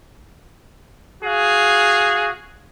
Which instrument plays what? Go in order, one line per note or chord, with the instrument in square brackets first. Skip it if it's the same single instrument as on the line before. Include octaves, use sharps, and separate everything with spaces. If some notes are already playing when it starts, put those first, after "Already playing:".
[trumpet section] F#4 G#4 F5